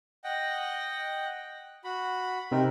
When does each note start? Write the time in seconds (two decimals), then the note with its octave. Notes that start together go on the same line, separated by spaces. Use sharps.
0.24 D#5 F#5 G5
1.84 F#4 B5
2.52 C3 C4 D#4 A#4